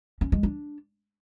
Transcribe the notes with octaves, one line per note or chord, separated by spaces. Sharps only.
C#4
G#3
D4